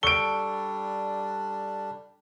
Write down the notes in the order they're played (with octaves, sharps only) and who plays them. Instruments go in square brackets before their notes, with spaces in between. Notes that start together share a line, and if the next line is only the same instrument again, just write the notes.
[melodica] G3 D4 [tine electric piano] A4 C#6 [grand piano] D7 G7